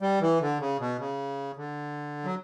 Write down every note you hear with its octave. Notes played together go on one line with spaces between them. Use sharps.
G3
E3
D3
C#3
B2
C#3
D3
F#3